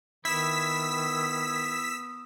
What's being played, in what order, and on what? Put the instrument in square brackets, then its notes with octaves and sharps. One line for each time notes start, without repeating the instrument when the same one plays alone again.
[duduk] D#3 [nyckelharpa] B3 D#6 [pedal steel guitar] E4 [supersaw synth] E6 B6